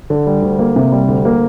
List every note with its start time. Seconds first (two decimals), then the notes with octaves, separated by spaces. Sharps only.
0.10 D3
0.27 G3
0.42 D2
0.59 A#3
0.76 C3
0.92 G3
1.08 D2
1.25 A#3